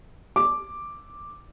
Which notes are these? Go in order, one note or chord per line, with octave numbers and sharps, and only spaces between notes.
D6